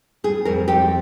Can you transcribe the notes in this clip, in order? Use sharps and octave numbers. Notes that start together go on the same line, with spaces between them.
G3 G#4
F2 A#4
F2 G4